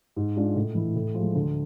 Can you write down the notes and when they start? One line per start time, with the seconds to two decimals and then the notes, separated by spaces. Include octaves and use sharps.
0.16 G#2
0.36 G#3 D4 F4
0.56 A2
0.75 E3 A3 E4
0.96 A2
1.14 F3 G#3
1.35 D2